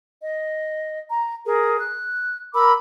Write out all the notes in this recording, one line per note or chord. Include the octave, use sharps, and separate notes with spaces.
D#5
A#5
G#4 A#4
F#6
A#4 B5 D6 E6